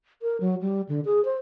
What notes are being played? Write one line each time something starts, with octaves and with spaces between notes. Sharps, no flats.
A#4
F#3
G3
D3
G#4
C5